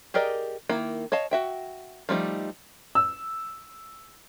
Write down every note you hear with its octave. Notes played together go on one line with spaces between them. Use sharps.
G4 G#4 A#4 D5 D#5
D#3 A#3 E4
C#5 D#5 F5 A5
F#4 E5 G5
F3 G3 A3 D#4
E6